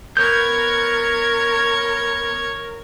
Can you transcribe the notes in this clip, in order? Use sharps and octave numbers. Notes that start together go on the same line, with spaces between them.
B3 A#4 C#5 G6 G#6